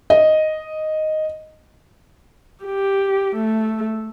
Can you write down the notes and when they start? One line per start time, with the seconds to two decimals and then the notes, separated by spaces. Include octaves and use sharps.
0.10 D#5
2.64 G4
3.36 A3